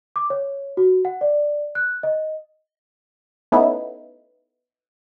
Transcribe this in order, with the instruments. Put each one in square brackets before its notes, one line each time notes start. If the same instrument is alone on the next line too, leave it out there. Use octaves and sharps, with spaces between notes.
[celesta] D6
C#5
F#4
F#5
D5
F#6
D#5
[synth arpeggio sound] A3 B3 C#4 D#4 E4